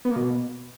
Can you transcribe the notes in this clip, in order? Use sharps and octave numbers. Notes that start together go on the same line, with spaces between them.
B3
A#3
B2